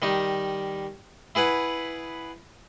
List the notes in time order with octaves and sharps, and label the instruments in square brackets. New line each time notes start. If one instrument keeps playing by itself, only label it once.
[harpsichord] D#3 G3 D#4
E4 G#4 B4 F#5